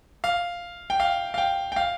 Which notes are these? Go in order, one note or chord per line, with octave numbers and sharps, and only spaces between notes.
F5
G5
F5
F5
G5
G5
F5